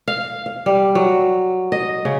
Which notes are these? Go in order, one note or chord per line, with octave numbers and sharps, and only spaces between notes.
F5
F5
G3
F#3
D#5
C#3